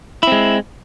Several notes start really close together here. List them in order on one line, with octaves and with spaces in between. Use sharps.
E4 C4 G#3